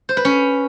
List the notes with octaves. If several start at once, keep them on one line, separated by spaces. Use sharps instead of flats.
C5
B4
C#4